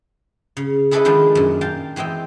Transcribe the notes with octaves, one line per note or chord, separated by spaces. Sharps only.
C#3
E4 G#4 A4 B4 D5 D#5
D#3 F3 G#3 D4
F#2 A#2
A#4 F5 G5 A5
E3 C4 G4 D#5 G5